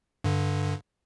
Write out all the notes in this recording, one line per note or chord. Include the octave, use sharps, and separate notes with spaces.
G2 D3